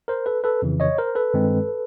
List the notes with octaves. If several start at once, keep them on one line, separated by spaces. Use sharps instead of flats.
A#4 C5
A4 B4
A4 B4
F2 C#3 E3
C#5 D#5
A#4 C5
A4 B4
G2 D#3 G#3 C4